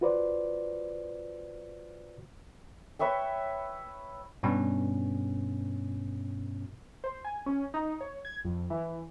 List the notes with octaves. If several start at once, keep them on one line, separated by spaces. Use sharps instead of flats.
F4 F#4 B4 C5 D5
B4 C#5 E5 G5
G2 B2 C#4
C5
G#5
C#4
D#4
C#5
G#6
F2
E3